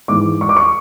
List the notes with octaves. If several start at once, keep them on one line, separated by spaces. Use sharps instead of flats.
G#2 E3 D6
C#6
D6
C#6